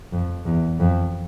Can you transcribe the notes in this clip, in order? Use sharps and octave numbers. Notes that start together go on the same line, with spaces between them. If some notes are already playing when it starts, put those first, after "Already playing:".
F2
E2
F2